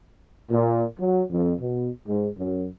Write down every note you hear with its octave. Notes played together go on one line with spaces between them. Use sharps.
A#2
F#3
F2
B2
G#2
F#2